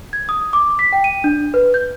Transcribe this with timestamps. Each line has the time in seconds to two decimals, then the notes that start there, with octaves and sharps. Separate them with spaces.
0.13 G#6
0.29 D#6
0.53 D6
0.79 B6
0.93 G5
1.04 D#7
1.24 D4
1.54 B4
1.74 G6